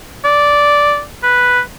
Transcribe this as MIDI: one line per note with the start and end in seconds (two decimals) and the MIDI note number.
0.24 1.01 74
1.23 1.61 71